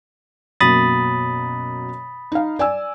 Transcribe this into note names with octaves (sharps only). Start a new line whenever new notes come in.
F#2 B2 A#3 B5 D#6 A6
D#4 F5
D5 G#5 E6